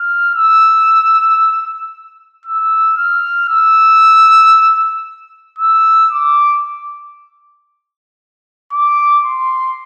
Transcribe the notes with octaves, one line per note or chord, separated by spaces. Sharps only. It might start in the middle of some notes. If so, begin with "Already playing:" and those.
Already playing: F6
E6
E6
F6
E6
E6
D6
D6
C6